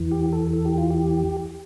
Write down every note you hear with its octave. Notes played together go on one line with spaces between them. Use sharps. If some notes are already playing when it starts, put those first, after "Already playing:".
Already playing: E2 E3
G4
A4
A4
G4
F4
G4